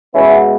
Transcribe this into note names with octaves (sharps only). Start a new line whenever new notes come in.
B2 G#3 B3 C#4 E4